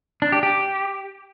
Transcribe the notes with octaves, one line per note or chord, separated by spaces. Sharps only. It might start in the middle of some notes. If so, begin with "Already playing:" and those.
D4
G4
G4